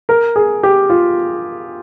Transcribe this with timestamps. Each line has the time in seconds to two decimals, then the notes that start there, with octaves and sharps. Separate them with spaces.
0.09 A#4
0.36 G#4
0.63 G4
0.90 F4